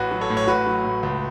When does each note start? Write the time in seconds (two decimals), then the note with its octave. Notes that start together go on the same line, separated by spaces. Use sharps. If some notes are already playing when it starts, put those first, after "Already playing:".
Already playing: A1 F#4 B4
0.11 F#3
0.21 A4 C#5
0.30 A2
0.37 C#5
0.47 A1 F#4 B4
0.66 F#3
0.84 A2
1.03 C#2